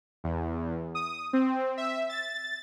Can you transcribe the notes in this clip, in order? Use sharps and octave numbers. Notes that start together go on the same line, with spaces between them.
E2
D#6
C4
E5
A6